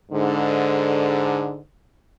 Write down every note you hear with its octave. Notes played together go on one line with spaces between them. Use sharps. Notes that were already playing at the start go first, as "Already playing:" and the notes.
G#2 D3